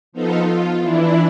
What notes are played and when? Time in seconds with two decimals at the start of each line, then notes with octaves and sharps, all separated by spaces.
0.12 F3 B3 D#4 F4 A4
0.45 F4
0.81 E3 D4 E4